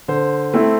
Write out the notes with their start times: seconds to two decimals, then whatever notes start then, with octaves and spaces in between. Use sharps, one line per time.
0.08 D3 C5
0.54 A3 C4 E4